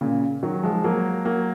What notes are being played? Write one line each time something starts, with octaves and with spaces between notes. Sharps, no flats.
A#2 C#3
D#3 F#3
F3 G#3
F#3 A#3
F#3 A#3